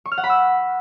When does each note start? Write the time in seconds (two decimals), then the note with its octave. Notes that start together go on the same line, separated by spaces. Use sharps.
0.06 C#6
0.12 F6
0.18 F#5
0.24 B5
0.30 E6